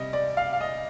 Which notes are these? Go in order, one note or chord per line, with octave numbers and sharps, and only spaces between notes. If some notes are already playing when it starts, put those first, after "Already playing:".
Already playing: C3 G3 D#5
D5
F5
F5
D#5